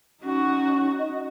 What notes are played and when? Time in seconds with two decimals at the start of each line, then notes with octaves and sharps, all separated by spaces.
0.23 C#4 D#4 F#4
0.98 D#5